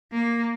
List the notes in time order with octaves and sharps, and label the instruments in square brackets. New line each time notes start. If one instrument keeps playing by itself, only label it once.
[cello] A#3